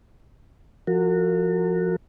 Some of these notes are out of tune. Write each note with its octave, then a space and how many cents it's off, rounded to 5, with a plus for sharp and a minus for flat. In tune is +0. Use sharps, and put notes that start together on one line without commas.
F3 +0 F#4 -10 A#4 -40